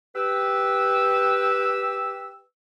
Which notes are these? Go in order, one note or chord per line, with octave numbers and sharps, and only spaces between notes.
G4 B4 E6